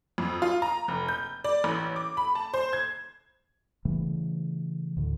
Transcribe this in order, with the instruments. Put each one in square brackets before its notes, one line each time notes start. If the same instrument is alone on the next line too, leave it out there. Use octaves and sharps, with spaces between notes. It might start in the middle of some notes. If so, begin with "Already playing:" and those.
[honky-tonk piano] F2
F4
A#5
F1
G6
D5
A1
D6
B5
A5
C5
G#6
[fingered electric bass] C#3 E3 G3 A3
D2 A2 D3